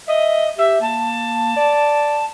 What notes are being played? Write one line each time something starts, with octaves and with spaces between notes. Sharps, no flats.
D#5 E5
G4 E5
A#3 A5
D5